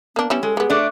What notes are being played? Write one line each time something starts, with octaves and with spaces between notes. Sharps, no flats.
A#3 B3 D4
G3 B3 C#4 E4
G#3 A4
G3 B3 G#4
A3 D4 D5